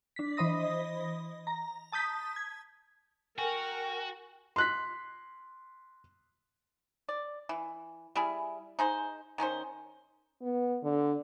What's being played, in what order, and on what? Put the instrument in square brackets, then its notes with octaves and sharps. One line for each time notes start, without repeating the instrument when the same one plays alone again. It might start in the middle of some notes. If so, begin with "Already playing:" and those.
[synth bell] D4 B6
E3 C5 D#5 B5 D#6 A#6
A#5
A5 D#6 G6 B6
G#6
[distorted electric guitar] F#4 [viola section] A#4 [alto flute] G5 [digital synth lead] G#5
[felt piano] C6 F#6 B6
[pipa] D5
E3
G3 E4 G#4
D#4 G#4 C5
D#3 C#4 D#4 C5
[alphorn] B3
D3